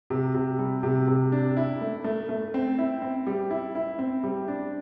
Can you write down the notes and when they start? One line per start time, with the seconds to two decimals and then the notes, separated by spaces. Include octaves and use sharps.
0.10 C3
0.35 C3
0.59 G3
0.83 C3
1.08 C3
1.32 D4
1.57 E4
1.81 A3
2.04 A3
2.29 A3
2.54 C4
2.78 E4
3.02 C4
3.27 G3
3.50 E4
3.75 E4
3.99 C4
4.23 G3
4.48 D4